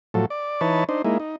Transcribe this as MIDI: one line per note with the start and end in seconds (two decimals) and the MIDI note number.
0.14 0.26 45
0.14 0.26 53
0.14 0.26 54
0.14 0.26 69
0.30 0.61 74
0.61 0.84 52
0.61 0.84 63
0.61 0.84 71
0.61 0.84 73
0.61 0.84 81
0.89 1.02 62
0.89 1.02 63
0.89 1.02 72
1.05 1.18 56
1.05 1.18 58
1.05 1.18 63
1.05 1.18 64
1.20 1.36 63